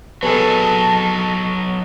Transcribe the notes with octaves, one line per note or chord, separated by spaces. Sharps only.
F#3 B3 D#4 G#4 A4 A5